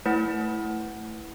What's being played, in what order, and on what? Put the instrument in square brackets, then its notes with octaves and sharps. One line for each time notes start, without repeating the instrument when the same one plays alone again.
[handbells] A3 E4 B4 F#5